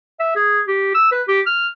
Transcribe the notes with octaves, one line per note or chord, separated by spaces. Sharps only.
E5
G#4
G4
E6
B4
G4
F6